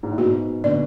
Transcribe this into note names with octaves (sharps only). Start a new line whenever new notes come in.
G#2
A2
G#2 B2 F#4
B2 D3 D5